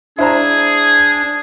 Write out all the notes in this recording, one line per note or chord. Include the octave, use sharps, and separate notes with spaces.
D4 E4 G#4 C5 A#5